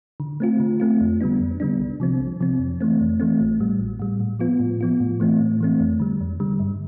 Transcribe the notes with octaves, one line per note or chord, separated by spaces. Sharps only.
D3
A3 C4 F4
D3
A3 C4 F4
F2
D3 G3 B3 D4
F2
D3 G3 B3 D4
C2
C3 F3 C4
C2
C3 F3 C4
F2
E3 A3 C4
F2
E3 A3 C4
A1
A2 G3
A1
A2 G3
A2
F3 B3 F4
A2
F3 B3 F4
A2
E3 A3 C4
A2
E3 A3 C4
F2
D3 G3
F2
D3 G3
G2